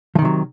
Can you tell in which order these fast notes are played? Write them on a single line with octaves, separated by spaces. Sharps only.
F3 D#3 C3 F#3